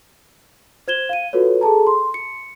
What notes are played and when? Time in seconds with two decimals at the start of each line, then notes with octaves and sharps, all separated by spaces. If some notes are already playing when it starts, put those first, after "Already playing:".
0.88 C5 G#6 E7 G7
1.09 F5 D#7
1.33 F4 F#4 A4 B4 C#5
1.61 G#4 A4 A5 A#5
1.87 C6
2.14 C#7